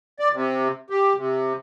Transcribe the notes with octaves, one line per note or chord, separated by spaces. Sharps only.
D5
C3
G4
C3